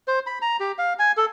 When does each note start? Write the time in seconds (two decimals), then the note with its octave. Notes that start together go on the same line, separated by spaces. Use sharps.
0.08 C5
0.27 B5
0.42 A#5
0.60 G4
0.78 F5
0.99 G#5
1.17 A4